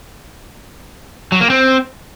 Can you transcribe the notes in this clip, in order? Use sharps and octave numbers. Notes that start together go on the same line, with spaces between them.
F#3
A#3
C4